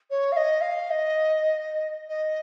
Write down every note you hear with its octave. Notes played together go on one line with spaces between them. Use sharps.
C#5
F5
D#5
F5
D#5
D#5